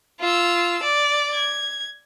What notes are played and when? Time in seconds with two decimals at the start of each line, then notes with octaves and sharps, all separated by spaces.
0.20 F4 E6
0.83 D5
1.34 G#6